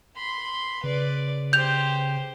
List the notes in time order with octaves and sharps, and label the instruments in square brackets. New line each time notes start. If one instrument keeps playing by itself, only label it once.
[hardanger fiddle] B5 C6
[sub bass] C#3 [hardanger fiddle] B4 D5
[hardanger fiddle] G4 C5 [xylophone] G6 F7